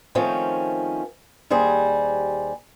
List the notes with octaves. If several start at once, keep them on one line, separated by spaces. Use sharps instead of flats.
D#3 F3 A3 C4 C#4
D#2 G3 G#4 C5